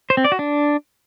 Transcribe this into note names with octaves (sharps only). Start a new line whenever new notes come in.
C5
C4
D5
F#4
D4